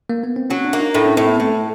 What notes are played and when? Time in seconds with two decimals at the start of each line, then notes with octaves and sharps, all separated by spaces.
0.10 A#3
0.24 B3
0.36 C4
0.50 F#3 C#4
0.65 D4
0.73 A#3
0.80 D#4
0.95 A2 D4
1.06 C#4
1.17 A2 C4
1.28 B3
1.40 A2 A3